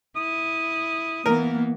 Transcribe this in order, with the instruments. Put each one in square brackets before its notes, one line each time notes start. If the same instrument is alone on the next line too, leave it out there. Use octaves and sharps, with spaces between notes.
[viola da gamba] E4 [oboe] D#6
[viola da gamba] E3 B3 [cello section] A#3 [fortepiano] A#4